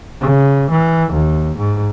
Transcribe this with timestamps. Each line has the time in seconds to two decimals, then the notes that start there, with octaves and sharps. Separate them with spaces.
0.21 C#3
0.71 E3
1.13 D#2
1.57 G#2